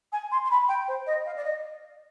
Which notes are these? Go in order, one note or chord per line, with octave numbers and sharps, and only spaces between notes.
G#5
C6
C6
B5
G5
C5
D#5
F5
D5
D#5